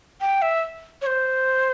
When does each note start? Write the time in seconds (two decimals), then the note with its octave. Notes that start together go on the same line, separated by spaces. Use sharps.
0.21 G5
0.42 E5
1.02 C#5
1.06 C5